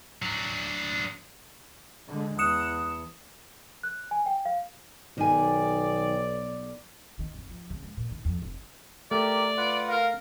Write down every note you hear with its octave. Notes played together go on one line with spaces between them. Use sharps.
F#3 D4
D3 G#3
E2 F#5 D#6 C#7 E7
F#6
G#5
G5
F5
B1 D#3 D5 G#5
D#3
F1
F3
C#3
G#3
A#2
D#3
F2
F1
A3 G4 A#4 D5
F4 B4 F#5
A#4 F5